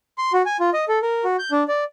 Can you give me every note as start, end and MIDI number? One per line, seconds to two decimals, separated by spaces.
0.18 0.32 84
0.33 0.42 66
0.46 0.57 80
0.60 0.70 65
0.74 0.85 75
0.88 0.99 69
1.02 1.24 70
1.24 1.36 66
1.39 1.51 91
1.51 1.63 62
1.68 1.84 74